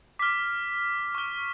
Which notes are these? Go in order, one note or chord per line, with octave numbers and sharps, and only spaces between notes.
D6 F6 B6
C#6 F6